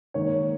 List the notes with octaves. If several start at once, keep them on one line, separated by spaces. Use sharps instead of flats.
G#2 D#3 A#3 C#5